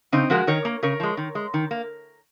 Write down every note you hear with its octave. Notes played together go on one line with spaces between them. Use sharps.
C#3 C4 D#4
F3 G#3 F#4 A#4
D#3 A#4 C#5
A#3
C#3 A#4 C#5
F3 G#3
D#3
G#3
D#3
A#3